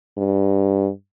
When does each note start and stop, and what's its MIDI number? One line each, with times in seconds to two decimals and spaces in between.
0.18 0.89 43